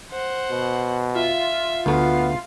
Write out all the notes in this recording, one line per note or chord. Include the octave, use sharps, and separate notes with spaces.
C5 F#5
B2
F4 E5
D2 A3 B3 F5